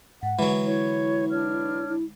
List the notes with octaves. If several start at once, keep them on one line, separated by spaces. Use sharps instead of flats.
G#2 F#5
D3 E3 F#3 G#3
E4 C#5
D4 C#5 F6
E4